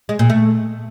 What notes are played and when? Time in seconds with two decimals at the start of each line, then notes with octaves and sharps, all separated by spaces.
0.09 G#3
0.19 A#2
0.30 A3